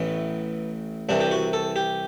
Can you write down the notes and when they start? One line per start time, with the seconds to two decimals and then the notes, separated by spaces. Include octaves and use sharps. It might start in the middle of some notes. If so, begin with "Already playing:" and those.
Already playing: A1 A2 E3 B3
1.09 C2 C3 E3 D4
1.20 G4
1.31 F#4
1.53 A4
1.76 G4